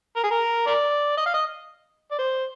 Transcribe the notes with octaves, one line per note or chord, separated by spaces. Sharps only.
A#4
G#4
A#4
A#4 D5
D#5
F5
D#5
D5
C5